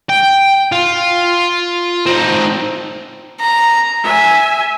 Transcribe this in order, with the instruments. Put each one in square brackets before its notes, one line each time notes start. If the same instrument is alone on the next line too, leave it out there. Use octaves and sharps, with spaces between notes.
[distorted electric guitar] G5
F4
C4 D#4
[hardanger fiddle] A#5
[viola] E5 G#5